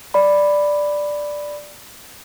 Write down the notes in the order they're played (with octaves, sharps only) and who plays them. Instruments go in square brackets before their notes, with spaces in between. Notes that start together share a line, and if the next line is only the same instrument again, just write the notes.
[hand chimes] D5 B5